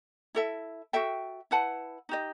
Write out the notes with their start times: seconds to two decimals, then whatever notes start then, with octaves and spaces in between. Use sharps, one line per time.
0.35 E4 A4 E5
0.93 F#4 A4 E5 G5
1.51 E4 B4 F#5 A5
2.09 D#4 G4 D#5